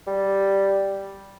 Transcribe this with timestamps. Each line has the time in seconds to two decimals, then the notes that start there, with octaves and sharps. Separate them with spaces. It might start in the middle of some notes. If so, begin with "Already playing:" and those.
0.07 G3